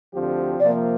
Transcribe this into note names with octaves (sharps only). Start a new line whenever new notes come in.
D2 D3 F3 C4 G4
C3 F3 A#3 D5